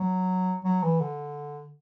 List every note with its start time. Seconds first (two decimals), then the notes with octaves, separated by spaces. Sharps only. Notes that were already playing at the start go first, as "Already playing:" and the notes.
Already playing: F#3
0.64 F#3
0.83 E3
1.01 D3